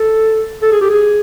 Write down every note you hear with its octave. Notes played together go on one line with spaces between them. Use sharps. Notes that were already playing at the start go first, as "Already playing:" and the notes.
Already playing: A4
A4
G#4
G4
G#4